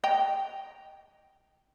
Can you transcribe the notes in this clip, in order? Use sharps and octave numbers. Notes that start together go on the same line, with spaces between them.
D#5 G5 A#5